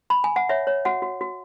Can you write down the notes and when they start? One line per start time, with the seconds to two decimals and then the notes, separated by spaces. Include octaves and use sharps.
0.10 B5
0.24 G#5
0.36 F#5
0.49 C#5 E5
0.67 C#5
0.85 F#4 F#5
1.02 F#4
1.21 F#4